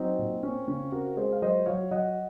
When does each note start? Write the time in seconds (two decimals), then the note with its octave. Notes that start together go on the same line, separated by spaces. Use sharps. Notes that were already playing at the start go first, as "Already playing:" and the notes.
Already playing: F#3 C4 D#4
0.18 A#2
0.43 C4 C#4
0.68 C#3 C#4
0.92 C4 F#4 A#4
1.17 G#3 G#4 C5
1.32 F5
1.42 F#3 C5 D#5
1.66 F#3 C#5 F5
1.91 F#3 D#5 F#5